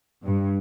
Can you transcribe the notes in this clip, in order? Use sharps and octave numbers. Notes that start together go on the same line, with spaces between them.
G2